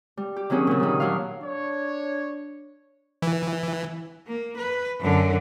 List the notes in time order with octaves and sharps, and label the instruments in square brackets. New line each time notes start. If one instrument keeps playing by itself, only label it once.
[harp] G3
G4
D#3 F#3 C4 C#4 G#4
A#2 C#3
D#3 G3
F#3 D4 E4 F5
[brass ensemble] D4 C#5
[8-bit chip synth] E3
[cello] A#3
B4
F#2 D3